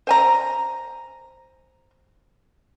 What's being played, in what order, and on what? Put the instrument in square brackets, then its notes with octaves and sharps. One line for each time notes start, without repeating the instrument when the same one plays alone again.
[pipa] C5 G#5 A#5